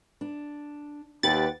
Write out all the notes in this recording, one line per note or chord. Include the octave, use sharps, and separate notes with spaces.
D4
D#2 G4 B4 F#5 A6